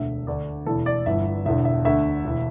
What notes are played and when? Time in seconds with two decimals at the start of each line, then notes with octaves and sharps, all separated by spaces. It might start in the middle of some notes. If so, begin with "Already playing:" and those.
Already playing: E1 D2 D3 E5
0.27 D2 D3 D5
0.66 E1 E2 E3 A4
0.86 D5
1.06 G1 G2 E3 E5
1.45 E1 E2 D3 E5
1.65 E5
1.85 D2 D3 E5
2.24 E1 E3